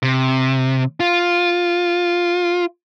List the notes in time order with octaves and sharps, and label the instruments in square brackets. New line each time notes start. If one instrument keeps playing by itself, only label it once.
[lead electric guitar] C3
F4